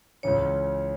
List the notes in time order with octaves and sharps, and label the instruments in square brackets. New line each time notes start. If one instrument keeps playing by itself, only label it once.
[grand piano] C#2 C#3 E3 [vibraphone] C#5